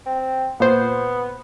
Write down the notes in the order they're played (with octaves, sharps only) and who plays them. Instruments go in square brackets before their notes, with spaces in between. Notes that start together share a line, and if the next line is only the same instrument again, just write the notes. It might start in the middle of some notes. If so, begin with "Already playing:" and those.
[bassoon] C4
[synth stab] A#2 C5 [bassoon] B3